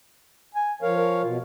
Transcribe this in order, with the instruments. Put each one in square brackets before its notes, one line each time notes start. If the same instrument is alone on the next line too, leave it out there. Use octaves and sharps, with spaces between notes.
[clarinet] G#5
[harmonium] F3 C#5 F5 [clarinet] A#4
[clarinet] A#4
[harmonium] B2 [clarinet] F4